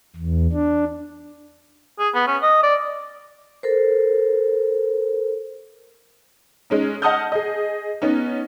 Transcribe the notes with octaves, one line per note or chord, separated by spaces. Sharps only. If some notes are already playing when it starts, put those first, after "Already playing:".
E2
D4
G#4
B3
C#4
D#5
D5
A4 A#4 C5
G#3 C#4 D#4
D#5 F#5 A5 D#6 F6 G6
G#4 D#5
B3 C#4 D#4